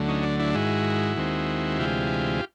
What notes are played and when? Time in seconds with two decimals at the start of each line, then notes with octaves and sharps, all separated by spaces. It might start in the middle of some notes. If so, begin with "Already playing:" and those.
Already playing: D2 D3 F#3 A3
0.08 C#4 D#4
0.23 D4
0.39 D4 E4
0.54 G#2 D#3 G#3 E4 F#4
1.17 D#2 D#3 G#3 C4
1.79 D2 C3 E3 G#3 F4 G4